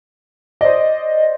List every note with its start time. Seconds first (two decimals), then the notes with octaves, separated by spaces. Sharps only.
0.61 C5 D5 D#5